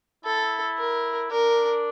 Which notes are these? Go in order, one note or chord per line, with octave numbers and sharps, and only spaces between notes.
E4 A4
A#4
D4 A#4